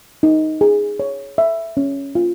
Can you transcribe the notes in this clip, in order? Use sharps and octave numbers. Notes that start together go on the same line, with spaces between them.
D#4
G#4
C#5
E5
C#4
F4